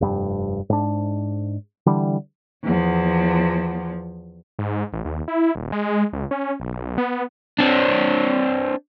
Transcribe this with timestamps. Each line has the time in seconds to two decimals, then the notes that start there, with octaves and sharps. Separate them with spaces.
0.01 F1 G2
0.70 G#2 D4
1.86 D3 E3 G3
2.64 E2 F3
4.59 G#2
4.93 A1
5.05 D#2
5.28 E4
5.55 D#1
5.72 G#3
6.13 C#2
6.31 C#4
6.60 B1
6.98 B3
7.59 C4 D4